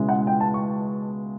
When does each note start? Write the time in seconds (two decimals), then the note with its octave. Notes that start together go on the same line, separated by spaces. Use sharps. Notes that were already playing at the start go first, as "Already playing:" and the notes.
Already playing: C#2 B2 G#3 C#4 E4
0.09 F#5
0.27 G5
0.40 A5
0.54 C#6